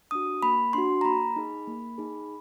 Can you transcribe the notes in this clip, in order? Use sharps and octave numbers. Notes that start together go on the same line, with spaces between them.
D4 F#4 D#6
A#3 B5
D4 F#4 C6
A#5
A#3 B5
D#4 G#4
A#3
D#4 G#4